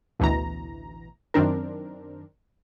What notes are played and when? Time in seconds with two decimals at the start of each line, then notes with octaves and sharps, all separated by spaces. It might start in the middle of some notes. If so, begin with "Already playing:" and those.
0.19 A1 D2 B2 E3 A#5
1.34 F#2 D#3 C4 D4 A#4